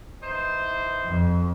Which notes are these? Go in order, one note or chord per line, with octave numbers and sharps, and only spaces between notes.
E3 D#4 C5
F2